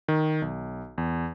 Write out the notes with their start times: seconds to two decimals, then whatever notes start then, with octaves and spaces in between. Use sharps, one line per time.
0.08 D#3
0.42 B1
0.98 E2